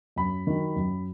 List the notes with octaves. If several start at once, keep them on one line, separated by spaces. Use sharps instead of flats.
F#2 B5
D#3 F#3
F#2